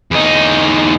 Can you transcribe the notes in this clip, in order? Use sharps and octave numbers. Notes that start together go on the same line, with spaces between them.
E2 D#4